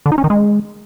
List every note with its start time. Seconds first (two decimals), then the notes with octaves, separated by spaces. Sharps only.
0.06 D3
0.12 D#4
0.18 C#4
0.24 D#3
0.30 G#3